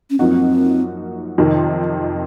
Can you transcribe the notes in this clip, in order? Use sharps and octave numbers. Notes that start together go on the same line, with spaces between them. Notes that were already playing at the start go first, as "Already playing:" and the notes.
C#4
F#2 F3 A#3 C4 D#4 F#4
F2 C3 D#3